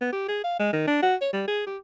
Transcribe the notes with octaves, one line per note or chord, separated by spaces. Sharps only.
B3
G4
G#4
F5
G#3
D#3
D4
F#4
C#5
G3
G#4
G4